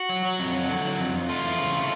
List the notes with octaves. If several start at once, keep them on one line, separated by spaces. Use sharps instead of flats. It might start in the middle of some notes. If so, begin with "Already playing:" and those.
Already playing: F#4
F#3
F#3
F2
F#3
D3
F#3
F2
F2
A3 F4
E2
C#3
A3